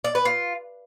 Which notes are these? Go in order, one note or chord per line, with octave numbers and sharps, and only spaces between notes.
D5
B4
F4